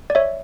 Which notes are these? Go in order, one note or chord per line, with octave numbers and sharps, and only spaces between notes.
D5
C#5 E5